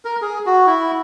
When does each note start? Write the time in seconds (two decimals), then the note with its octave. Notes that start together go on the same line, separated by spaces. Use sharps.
0.05 A#4
0.22 G#4
0.46 F#4
0.67 E4